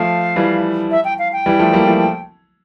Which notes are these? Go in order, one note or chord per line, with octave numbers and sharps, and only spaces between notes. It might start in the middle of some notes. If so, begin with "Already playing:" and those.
Already playing: F3 A3 F5
E3 G3
E5
G5
F5
G5
E3 G3
F3 A3
G3 A#3
F3 A3